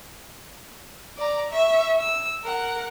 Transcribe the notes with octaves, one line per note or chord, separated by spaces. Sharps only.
D5 A#5
E5 C#6
E6
A#4 F#5